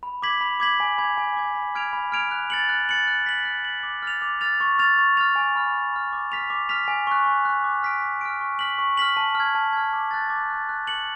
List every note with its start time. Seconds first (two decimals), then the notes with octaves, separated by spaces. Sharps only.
0.03 B5
0.22 D6 G#6 B6 F#7
0.41 B5
0.60 D6 G#6 B6 F#7
0.80 G#5
0.98 B5 D6 G#6
1.18 G#5
1.37 B5 D6 G#6
1.55 B5
1.75 F6 G#6 D7 F7
1.93 B5
2.12 F6 G#6 D7 F7
2.31 F#6
2.50 A6 C#7 F#7
2.69 F#6
2.89 A6 C#7 F#7
3.08 F#6
3.26 B6 F#7
3.45 F#6
3.65 F#7
3.70 B6
3.83 D6
4.02 F6 A6 F7
4.22 D6
4.41 F6 A6 F7
4.60 C#6
4.79 F6 A6 F7
4.98 C#6
5.17 F6 A6 F7
5.36 G#5
5.56 B5 F6
5.74 G#5
5.93 B5 F6
6.13 D6
6.32 F6 B6 F7
6.50 D6
6.69 F6 B6 F7
6.88 G#5
7.07 C#6 F#6
7.26 G#5
7.45 C#6 F#6
7.64 D6
7.83 F6 B6 D7
8.02 D6
8.21 F6 B6 D7
8.41 C#6
8.59 F6 B6 F#7
8.78 C#6
8.97 F6 B6 F#7
9.17 A5
9.35 F6
9.40 G#6
9.55 A5
9.73 F6 G#6
9.93 D6
10.11 F#6 A6
10.30 D6
10.50 F#6 A6
10.69 F#6
10.87 C#7 F#7